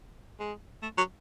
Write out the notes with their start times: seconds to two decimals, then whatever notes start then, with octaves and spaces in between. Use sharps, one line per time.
0.40 G#3
0.82 A3
0.98 F#3